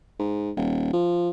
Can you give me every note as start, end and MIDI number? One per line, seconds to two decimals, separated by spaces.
0.19 0.51 44
0.56 0.91 27
0.93 1.30 53